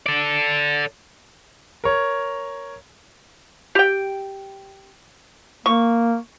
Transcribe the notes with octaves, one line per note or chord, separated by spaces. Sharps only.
A4 D5
A#4 C#5
G4 G5
A#3 C#6